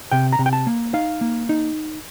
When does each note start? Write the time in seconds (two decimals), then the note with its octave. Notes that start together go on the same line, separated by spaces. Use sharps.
0.12 C3 G5
0.33 A#5
0.39 C3
0.46 G5
0.53 A5
0.67 A#3
0.94 D#4 F5
1.21 A#3
1.49 D#4